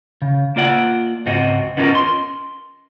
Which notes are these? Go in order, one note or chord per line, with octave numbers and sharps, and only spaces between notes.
C#3
A#3 F4 D5 F#5
C#2 G#2 C4 F#4 D#5
B3 C#4 D#4 F4 A#4
C6